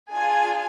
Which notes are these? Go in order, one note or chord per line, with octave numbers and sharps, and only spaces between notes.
D4 F4 G#4 G#5